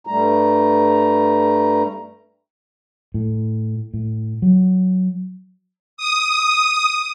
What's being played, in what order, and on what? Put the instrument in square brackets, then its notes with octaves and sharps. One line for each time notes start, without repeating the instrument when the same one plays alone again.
[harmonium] G2 G3 A3 A#5
[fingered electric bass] A2
A2
F#3
[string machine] D#6